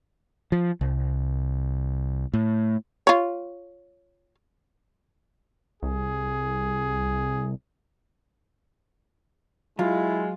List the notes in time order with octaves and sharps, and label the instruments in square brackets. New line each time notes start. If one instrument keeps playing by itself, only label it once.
[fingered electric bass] F3
C2
A2
[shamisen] F4 C#5
[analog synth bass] C2 [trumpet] G#4
[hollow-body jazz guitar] F#3 [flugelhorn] G#3 [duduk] E4 [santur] F4